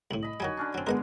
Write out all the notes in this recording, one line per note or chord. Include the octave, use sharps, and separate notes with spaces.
C2 A2 F#7
D#5 B5
D#3 F#3 G3 F#4 G#5
D3 C#4 D4
F#3 C4
G#3 B3 A#4 D#5 F#5